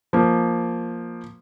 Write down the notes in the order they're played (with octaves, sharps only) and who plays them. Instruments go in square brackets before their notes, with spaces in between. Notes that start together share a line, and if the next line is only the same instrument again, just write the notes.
[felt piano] F3 A#3